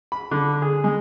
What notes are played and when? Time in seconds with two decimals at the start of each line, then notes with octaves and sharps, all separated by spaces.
0.12 B5
0.31 D3
0.62 G#4
0.84 G#3